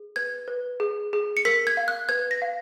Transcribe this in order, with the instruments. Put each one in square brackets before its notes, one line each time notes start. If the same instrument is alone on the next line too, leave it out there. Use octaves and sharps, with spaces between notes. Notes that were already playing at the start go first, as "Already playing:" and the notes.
Already playing: [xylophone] G#4
B4 G#6
B4
G#4
G#4
C#7
A#4 B6
G#6
F5
F#6
B4 G#6
A#6
F5